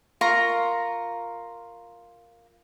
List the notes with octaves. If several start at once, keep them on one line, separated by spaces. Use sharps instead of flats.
F4 A#4 A#5 C#6